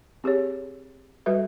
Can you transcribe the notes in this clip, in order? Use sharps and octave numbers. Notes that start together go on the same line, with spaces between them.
C4 G4 G#4 C#5
G3 F#4 A4 B4 E5